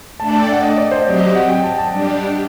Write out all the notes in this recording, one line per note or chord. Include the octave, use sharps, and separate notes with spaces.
A3 D4 A4 D5 A5
A5
G5
F#5
D#5
D5
C5
D#5
F#3 C4 G4 D5
D#5
F#5
G5
A5
A5
G3 D4 G4